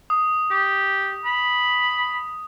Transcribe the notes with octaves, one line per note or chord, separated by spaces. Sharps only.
D#6
G4
B5